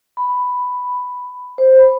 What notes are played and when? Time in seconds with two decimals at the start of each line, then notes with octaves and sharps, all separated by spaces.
0.17 B5
1.58 C5
1.79 B5